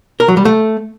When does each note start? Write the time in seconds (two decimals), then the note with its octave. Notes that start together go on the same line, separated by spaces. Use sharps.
0.20 A#4
0.28 F#3
0.37 G3
0.45 A3